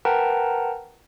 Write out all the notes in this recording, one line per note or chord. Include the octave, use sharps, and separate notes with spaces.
A#4 B4 F#5 G5 A5 A#5